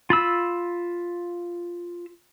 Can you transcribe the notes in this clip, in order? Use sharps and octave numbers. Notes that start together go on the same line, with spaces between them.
F4 B5 E6